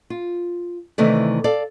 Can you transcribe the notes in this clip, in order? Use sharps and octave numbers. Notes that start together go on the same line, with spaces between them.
F4
C3 D#3 E3 A3 E4 D5
A4 D5 F5